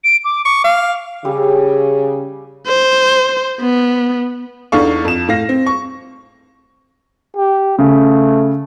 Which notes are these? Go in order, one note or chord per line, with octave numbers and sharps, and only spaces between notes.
D7
D6
C#6 D6
F5
C#3 G3 G4 E6
C5
B3
E2 D4 D#4 A4 F5 C#6
F2 E7
A2 F5 A#6
C4
C#6
G4
C#3 A3